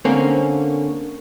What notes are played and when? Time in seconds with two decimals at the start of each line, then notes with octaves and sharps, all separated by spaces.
0.05 D3 A#3 C4 C#4